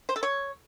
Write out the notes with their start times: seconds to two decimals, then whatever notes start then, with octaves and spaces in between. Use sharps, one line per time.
0.09 C5
0.16 A4
0.23 C#5